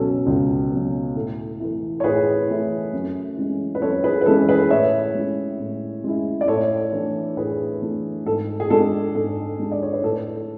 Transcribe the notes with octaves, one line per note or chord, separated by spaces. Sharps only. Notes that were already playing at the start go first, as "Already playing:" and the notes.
Already playing: C#2 B2 F#3 C#4 A4
C#2
B2 F#3 C#4
A2 A4
E3 A3 E4
C#5
A2 G#4 B4
E3 A3 E4
F#2
E3 G#3 C#4
B4
F#2 A4 C#5
G#4 B4
B4
E3 G#3 C#4 A4
G#4 B4
A2 C#5 E5
G#3 C#4 E4
A2
G#3 C#4 E4
D5
A2 A4 C#5
E3 A3 D4
A2 G#4 B4
E3 A3 D4
G#2 A4
G#4
G#3 D4 A4
G#2 A4
G#3 D4
D5
C#5
B4
A2 A4